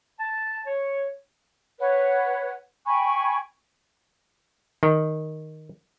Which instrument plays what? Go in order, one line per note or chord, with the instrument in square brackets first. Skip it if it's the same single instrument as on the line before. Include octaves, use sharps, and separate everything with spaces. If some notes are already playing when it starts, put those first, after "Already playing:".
[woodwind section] A5
C#5
[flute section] B4 C#5 F#5
G5 G#5 B5 C#6
[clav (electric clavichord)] D#3